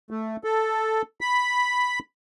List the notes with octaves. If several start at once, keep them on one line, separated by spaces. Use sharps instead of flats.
A3
A4
B5